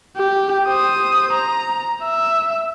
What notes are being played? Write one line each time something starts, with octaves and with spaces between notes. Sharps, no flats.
G4
C5 D#6
A#5
E5